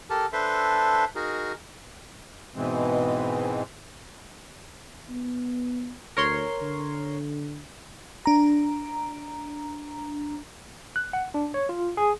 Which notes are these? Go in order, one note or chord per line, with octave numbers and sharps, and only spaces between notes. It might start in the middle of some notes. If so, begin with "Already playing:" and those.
G4 A4 A#4 A5
D4 A4 B4 C5 E5 C6
D#4 F#4 G#4 A#4
G#2 B2 E3 G#3 C4
B3
D2 A#4 C#5 C6
D3
D4 A#5
F#6
F#5
D4
C#5
F4
G#4